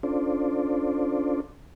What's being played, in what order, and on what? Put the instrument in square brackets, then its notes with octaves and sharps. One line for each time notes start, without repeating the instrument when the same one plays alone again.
[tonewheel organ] C#4 D4 F4 A4 C5 D5